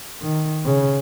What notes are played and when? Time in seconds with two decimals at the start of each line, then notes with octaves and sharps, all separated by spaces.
0.22 D#3
0.66 C#3